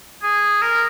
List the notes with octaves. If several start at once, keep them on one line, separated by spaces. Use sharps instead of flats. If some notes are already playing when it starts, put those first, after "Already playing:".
G#4
A#4